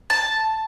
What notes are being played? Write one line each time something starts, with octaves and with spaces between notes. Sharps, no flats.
A5